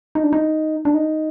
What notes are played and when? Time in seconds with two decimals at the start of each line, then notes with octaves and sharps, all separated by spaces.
0.15 D#4
0.23 D4
0.33 D#4
0.85 D4
0.94 D#4